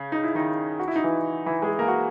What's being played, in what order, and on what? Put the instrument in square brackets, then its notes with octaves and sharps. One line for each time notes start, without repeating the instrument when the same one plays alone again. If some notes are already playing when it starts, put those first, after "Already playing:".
Already playing: [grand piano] C#3
D#4
E4
D#3 D#4
F#4
E4
D#4
E3 E4
E3 E4
G#3 G#4
A#3 A#4
F#4